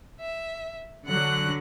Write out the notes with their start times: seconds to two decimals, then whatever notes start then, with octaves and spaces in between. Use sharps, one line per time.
0.20 E5
1.06 D3 F#3 F#5 F#6